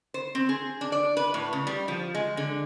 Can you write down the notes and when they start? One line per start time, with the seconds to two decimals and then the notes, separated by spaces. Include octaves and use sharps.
0.14 C5
0.35 C4
0.49 G#4
0.81 D4
0.92 D5
1.17 B4
1.34 A2
1.53 C#3
1.67 G3
1.88 F3
2.15 G#3
2.37 D3